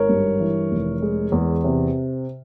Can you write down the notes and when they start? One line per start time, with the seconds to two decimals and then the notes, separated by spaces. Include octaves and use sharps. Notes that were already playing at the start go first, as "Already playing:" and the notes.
Already playing: G#1 A#4 C#5
0.09 G2
0.40 E3
0.72 F1
1.02 G#3
1.32 E2
1.64 C3